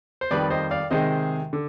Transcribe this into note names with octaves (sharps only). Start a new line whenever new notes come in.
C5
F2 D#3 G3 B4 D5
C5 D#5
D5 F5
C3 D#3 G#3 C5 D#5
D3